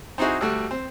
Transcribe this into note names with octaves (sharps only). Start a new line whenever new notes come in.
C4 D#4 E4 F#4 G#4
D2 G3 A3 F#4
C4